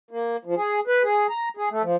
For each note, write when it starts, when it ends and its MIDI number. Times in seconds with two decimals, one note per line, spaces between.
0.11 0.37 58
0.45 0.55 53
0.57 0.80 68
0.87 1.03 71
1.04 1.27 68
1.30 1.49 82
1.57 1.69 68
1.71 1.82 57
1.83 1.96 53